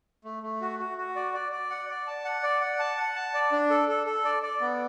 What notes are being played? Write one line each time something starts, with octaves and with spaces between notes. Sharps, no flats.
A3
A3
F#4
F#4
F#4
D5
D5
D5
F#5
D5
A5
F#5
D5
F#5
A5
F#5
A5
D5
D4
A4
A4
A4
D5
D5
B3